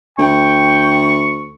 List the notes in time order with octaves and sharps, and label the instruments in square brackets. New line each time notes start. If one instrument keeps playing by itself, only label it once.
[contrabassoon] D2 [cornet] G5 [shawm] C#6